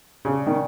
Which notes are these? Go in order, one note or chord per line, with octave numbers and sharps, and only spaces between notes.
C#3 D4
D#3